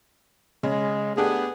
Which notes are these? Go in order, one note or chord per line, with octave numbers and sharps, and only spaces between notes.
C#3 G#3
A3 B3 D4 G4 G#4